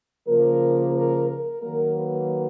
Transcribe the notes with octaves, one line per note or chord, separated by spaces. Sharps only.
C#3 F3 A#3 A#4
A#4
A#4
D#3 F#3 A#3 A#4
B4